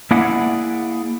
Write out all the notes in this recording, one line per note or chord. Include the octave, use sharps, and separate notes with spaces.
A#3 E4 G#4 D5 E5 F#5